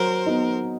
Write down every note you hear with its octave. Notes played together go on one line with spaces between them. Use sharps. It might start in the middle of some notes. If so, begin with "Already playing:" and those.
Already playing: F#3 A#4 C5
B3 D#4